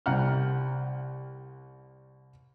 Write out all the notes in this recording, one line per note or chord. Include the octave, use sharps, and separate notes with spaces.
C2 G3 F#5 A#5 F6